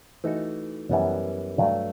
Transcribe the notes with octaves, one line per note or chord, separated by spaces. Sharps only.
E3 A3 D#4 F#4 A4
F#2 E3 G3 B3
G2 F#3 A3